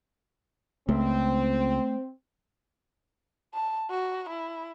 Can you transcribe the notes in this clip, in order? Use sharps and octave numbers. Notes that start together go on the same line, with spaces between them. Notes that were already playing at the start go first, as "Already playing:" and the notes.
C#2 A3 C4
A5
F#4
E4